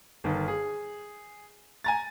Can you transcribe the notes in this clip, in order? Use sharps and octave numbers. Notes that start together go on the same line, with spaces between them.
G1 D#3
G#4
G#5 A#5 A6